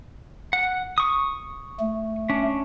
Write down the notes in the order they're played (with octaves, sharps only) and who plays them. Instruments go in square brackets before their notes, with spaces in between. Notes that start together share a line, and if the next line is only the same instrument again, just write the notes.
[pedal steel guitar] F#5
C#6 D#6
[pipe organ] A3
[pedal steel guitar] C#4 D4